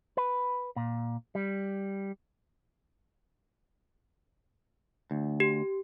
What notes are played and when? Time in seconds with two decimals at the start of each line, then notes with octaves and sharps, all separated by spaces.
0.17 B4
0.76 A#2
1.35 G3
5.11 D2
5.40 G4